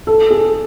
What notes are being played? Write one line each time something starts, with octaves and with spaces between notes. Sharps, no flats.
A4
G#4